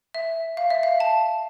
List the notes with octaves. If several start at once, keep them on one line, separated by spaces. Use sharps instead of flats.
E5
F5
E5
F5
A5